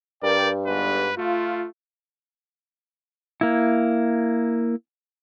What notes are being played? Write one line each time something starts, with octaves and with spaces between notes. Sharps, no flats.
G2 A#4 D5 G5
G1 G#2 B4
A3 F4
A#3 E4